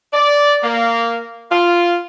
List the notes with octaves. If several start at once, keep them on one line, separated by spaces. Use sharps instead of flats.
D5
A#3
F4